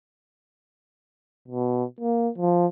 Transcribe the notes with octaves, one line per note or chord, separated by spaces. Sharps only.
B2
A#3
F3